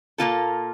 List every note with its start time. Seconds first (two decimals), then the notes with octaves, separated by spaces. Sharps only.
0.18 A#2 F3 A#3 F4 A4